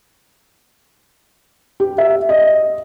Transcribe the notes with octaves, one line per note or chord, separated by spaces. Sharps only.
G4
E5
D#5